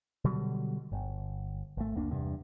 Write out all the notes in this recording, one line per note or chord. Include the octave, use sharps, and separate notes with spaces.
B2 D3 F#3 G3
G1
G#1 A3
F#1 D2 A#3 D4
E2 G2 C3